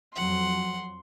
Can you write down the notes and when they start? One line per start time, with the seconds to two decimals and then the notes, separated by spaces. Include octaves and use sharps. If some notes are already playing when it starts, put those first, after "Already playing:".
0.16 F2 F#3 F#5 C6